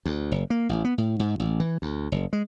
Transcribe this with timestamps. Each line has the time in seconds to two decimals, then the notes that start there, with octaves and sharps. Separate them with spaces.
0.06 D2
0.32 F#1
0.50 A#3
0.69 A1
0.85 B3
0.98 A2
1.19 G#2
1.40 A1
1.60 E3
1.82 D2
2.12 F#1
2.33 G#3